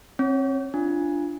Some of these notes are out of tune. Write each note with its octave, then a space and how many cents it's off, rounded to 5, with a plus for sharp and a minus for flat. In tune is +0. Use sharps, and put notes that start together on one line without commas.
C4 +40 C#5 +0
D4 +0 F4 -20